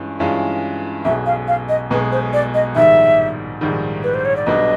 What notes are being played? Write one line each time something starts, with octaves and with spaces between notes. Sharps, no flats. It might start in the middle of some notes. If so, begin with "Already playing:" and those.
Already playing: G2 E3 G#3 C#4 F4
G2 E3 G#3 C#4 F4
B1 B2 G#3 E5
F5
F5
D#5
B1 B2 G#3 B4
C5
D5
D#5
A#1 G#2 D#3 G3 E5
A#1 G#2 D#3 G3
B4
C5
C#5
D5
B1 B2 G3 B3 D4 D#5